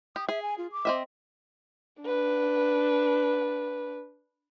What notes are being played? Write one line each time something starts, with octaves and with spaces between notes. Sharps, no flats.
G4 D#6
G#4 E5
G#5
F4
D6
C4 D#5 E5
D4 B4